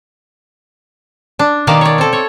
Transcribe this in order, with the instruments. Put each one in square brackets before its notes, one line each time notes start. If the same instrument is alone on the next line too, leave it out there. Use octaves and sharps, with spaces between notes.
[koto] D4
B2 D#3 A#3 D5 F5 A5
C#5 D5
C4 A4
C#5